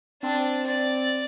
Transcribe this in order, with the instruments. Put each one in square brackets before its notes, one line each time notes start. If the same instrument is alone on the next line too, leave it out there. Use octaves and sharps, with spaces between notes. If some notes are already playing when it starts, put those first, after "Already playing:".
[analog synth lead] C4 [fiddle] D4
[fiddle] D5